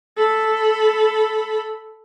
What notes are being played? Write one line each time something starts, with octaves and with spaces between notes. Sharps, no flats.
A4 B5